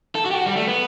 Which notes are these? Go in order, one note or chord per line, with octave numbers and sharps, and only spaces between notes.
A4
F#4
G4
F#4
G3
A3
B3